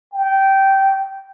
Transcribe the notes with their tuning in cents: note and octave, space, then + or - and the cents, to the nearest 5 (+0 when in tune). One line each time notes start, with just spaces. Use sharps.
G5 -15